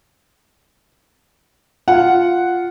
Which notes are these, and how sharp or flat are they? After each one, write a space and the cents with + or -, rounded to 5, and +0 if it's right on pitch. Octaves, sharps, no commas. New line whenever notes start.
F4 +0 F#5 +0